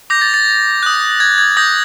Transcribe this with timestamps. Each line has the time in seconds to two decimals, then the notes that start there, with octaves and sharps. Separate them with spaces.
0.10 D6 G6 A#6
0.22 A6
0.34 A6
0.83 D#6 F#6
1.20 G#6
1.38 G#6
1.57 D#6 G6 A#6